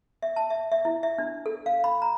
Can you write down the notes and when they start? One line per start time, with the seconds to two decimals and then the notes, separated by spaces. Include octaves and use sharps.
0.22 E5
0.36 A5
0.50 E5
0.72 E5
0.85 E4
1.03 E5
1.18 D4
1.46 A4
1.66 F5
1.84 B5
2.02 A#5